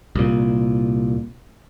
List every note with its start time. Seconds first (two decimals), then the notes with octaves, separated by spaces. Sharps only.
0.16 C2 A#2